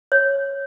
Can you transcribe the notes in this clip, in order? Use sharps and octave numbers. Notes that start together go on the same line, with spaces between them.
C#5